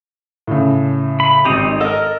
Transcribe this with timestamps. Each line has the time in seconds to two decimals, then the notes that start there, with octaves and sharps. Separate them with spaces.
0.47 A2 C#3
1.20 B5
1.45 G#1 C4 D#4 G4 D#6
1.81 A4 A#4 D#5